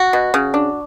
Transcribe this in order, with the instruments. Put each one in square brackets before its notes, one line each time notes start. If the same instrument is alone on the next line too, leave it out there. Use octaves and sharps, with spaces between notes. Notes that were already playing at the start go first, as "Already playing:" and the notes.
Already playing: [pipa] F#4
B2
C#3
D4